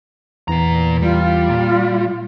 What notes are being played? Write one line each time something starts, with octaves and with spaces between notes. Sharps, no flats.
E2 A#2 E3 B3 A#5
G3 F4
A#2